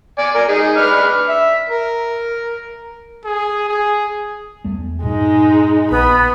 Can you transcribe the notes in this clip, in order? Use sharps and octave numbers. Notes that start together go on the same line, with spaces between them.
D5 G#5
A#4 G#5
D#4 G#4
D4 B4 F6
E5
A#4
G#4
G#4
E2 G3 A3
G2 A#2 G#3 D#4
A#1 B3 B5